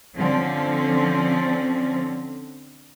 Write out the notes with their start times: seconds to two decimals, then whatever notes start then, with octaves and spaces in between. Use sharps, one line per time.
0.17 D3 F3 C4 C#4